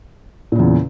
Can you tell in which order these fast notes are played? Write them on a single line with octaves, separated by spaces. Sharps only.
A#2 C#3 E2